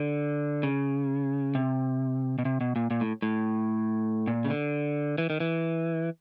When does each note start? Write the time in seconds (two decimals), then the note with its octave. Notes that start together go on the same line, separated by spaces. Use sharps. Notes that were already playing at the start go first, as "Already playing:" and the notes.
Already playing: D3
0.63 C#3
1.55 C3
2.39 B2
2.45 C3
2.61 B2
2.76 A#2
2.91 A#2
3.01 A2
3.22 A2
4.27 A#2
4.45 C#3
4.50 D3
5.18 E3
5.30 D#3
5.40 E3